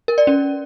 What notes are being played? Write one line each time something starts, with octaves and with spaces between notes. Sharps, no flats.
A#4
D5
C#4